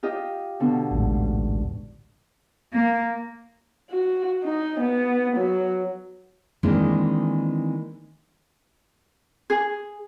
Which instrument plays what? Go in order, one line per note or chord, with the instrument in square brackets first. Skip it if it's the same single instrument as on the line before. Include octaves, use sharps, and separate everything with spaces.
[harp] F4 G4 D#5
B2 D3
[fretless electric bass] A1 D2 G#2
[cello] A#3
[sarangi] F#4
D#4
B3
F#3
[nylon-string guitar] D#3 E3 G#3 A#3 C4 D4
[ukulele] G#4